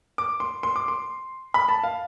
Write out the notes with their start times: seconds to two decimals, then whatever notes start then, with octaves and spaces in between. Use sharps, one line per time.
0.18 D6
0.40 C6
0.63 C6
0.76 D6
0.88 C6
1.54 B5
1.69 A5
1.84 F5